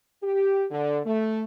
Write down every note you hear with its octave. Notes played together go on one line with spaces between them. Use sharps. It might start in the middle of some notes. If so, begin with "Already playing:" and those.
G4
D3
A3